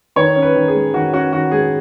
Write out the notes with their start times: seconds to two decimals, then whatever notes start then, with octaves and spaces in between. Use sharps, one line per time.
0.16 D#3 C#5
0.36 C#4
0.42 B4
0.56 D#3
0.68 G#4
0.74 G#3
0.94 D#3 F#4
1.13 C#4 F#4
1.33 D#3 F#4
1.51 G#3 G#4